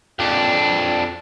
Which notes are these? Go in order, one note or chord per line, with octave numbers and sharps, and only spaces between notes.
F2 D4